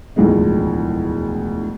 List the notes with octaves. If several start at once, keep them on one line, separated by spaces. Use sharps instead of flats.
E1 D2 A2 F3 G#3 D#4